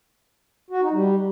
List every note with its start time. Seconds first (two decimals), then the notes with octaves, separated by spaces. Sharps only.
0.70 F#4
0.81 D#4
0.93 G3